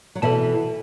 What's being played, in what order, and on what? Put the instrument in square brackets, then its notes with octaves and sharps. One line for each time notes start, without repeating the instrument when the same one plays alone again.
[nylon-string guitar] F#3
[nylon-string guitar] B2 E3 [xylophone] A4 E5 A5